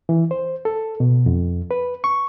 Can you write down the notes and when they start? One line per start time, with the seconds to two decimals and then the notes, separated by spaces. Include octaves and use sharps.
0.09 E3
0.31 C5
0.65 A4
1.00 B2
1.26 F2
1.71 B4
2.04 C#6